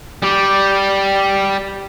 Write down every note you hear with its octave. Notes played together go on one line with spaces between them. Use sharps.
G3 G4